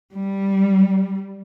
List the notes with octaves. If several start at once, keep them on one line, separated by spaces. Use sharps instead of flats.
G3